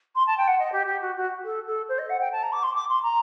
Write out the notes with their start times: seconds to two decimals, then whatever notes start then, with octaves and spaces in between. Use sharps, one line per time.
0.15 C6
0.27 A5
0.38 G5
0.48 F#5
0.59 D#5
0.72 G4
0.87 G4
1.02 F#4
1.16 F#4
1.44 A4
1.67 A4
1.89 C5
1.99 D#5
2.10 F#5
2.21 G5
2.32 A5
2.43 A#5
2.52 D6
2.63 C6
2.75 D6
2.89 C6
3.03 A#5